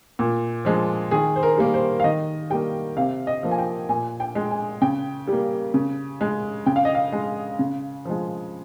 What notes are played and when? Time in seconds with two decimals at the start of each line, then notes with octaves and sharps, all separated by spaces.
0.19 A#2
0.65 F3 G#3
1.11 D#3 G#4
1.36 C5
1.43 A#4
1.58 G3 A#3
1.74 C5
2.00 F5
2.04 D#3 D#5
2.50 G3 A#3 G5
2.97 C3 F5
3.27 D#5
3.43 F3 A#3
3.51 G#5
3.58 G5
3.89 A#2 G#5
4.20 G5
4.35 G#3
4.51 G#5
4.81 C#3 G5
5.27 G3 A#3
5.74 C#3
6.21 G#3
6.66 C#3 G5
6.76 F5
6.85 D#5
6.95 F5
7.12 G#3
7.59 C#3
8.05 F3 G#3